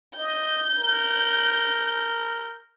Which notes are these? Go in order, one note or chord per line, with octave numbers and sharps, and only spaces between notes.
D#5 G6
A#4